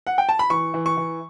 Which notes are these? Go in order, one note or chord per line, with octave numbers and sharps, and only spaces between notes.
F#5
G5
A5
B5
E3 C#6
E3
C#6
E3